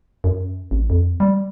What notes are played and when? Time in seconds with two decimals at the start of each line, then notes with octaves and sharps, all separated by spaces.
0.24 F#2
0.71 A1
0.90 F2
1.20 G3